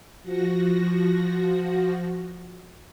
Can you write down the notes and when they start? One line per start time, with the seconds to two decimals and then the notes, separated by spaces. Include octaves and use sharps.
0.23 F3 F#4 A#6